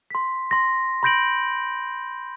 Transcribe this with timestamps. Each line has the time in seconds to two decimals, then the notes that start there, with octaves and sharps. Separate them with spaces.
0.10 C6 B6
0.51 C6 A#6
1.03 B5 C6 G6 A#6 D7 F#7